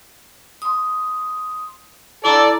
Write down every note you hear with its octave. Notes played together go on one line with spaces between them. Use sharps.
C6 D#6
E4 A4 D5 A#5 E6